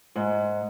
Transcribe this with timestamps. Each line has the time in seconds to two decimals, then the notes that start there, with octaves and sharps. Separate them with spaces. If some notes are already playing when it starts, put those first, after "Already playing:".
0.16 G#2